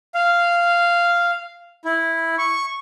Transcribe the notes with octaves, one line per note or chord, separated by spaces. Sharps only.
F5
E4
C#6